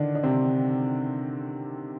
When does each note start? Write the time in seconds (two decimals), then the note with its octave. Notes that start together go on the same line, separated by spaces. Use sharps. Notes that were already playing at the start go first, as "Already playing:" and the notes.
Already playing: D3 D#3 D4
0.15 D4
0.23 C3 C4